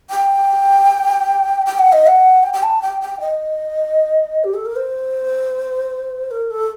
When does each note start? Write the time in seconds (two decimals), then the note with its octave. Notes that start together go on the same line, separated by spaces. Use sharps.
0.10 G5
1.66 G5
1.79 F#5
1.92 D#5
2.07 F#5
2.43 G5
2.53 G5
2.63 A5
2.82 G5
3.01 G5
3.20 D#5
4.44 G4
4.54 A4
4.65 A#4
4.76 C5
6.31 A#4
6.51 A4